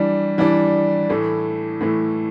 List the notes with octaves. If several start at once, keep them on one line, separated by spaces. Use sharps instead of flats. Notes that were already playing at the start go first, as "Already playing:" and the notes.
Already playing: E3 G3 D4
E3 G3 D4
A2 E3 A3
A2 E3 A3